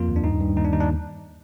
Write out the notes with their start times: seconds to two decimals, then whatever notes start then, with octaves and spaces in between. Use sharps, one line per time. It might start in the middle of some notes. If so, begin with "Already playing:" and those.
Already playing: F2 A#3 F4
0.08 D#2
0.16 D4
0.24 G2 D#4
0.40 G2
0.56 D#2 D#4
0.65 D4
0.72 D#2 D#4
0.80 D4